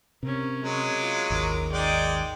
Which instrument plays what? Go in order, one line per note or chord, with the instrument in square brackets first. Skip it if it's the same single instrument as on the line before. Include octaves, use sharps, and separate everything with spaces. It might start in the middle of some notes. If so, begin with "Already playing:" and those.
[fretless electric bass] C3 [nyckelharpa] C#4 A#4
[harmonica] F#3 G#3
[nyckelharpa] F4 D6
[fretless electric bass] G#1 D#2 [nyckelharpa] A#4 D6
[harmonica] G#3 D5 [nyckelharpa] D#4 G5